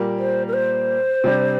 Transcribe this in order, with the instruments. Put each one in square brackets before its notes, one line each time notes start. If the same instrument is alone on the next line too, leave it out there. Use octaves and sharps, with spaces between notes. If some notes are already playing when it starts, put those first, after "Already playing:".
Already playing: [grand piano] A#2 G3 A#3
[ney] C5
A#4
C5
[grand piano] C3 G3 D4